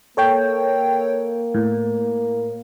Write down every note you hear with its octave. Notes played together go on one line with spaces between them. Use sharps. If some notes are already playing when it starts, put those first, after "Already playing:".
A#3 A4 C#5 G5
A2